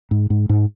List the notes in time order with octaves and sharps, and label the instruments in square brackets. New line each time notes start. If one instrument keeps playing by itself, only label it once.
[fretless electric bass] G#2
G#2
G#2